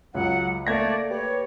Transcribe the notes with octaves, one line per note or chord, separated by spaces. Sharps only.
C#2 F#3 F#5
A3 A#3 D5 G#6 A#6
G4 B4 C#5